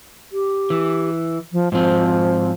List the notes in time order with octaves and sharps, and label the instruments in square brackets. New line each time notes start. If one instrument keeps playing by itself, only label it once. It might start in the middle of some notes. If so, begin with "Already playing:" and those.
[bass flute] G4
[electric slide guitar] E3
[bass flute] F3
[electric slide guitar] G#2 C4 [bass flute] F3